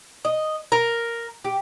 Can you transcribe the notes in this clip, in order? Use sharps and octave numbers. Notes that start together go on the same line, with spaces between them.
D#5
A#4
G4